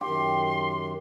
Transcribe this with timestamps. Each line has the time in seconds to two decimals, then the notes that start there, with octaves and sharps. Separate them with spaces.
0.01 F#2 D#3 G4 C6